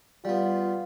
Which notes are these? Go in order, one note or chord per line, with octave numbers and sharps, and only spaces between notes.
G3 B3 F4